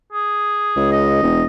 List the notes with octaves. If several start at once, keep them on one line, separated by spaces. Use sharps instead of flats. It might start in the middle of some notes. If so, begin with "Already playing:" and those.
G#4
C#2
D#5
E1